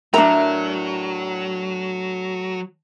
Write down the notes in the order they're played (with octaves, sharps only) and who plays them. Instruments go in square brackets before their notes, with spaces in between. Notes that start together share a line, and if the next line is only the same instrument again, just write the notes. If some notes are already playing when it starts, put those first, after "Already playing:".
[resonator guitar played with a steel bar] A2 A#4 E5 [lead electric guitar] F#3 [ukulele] D4 A#5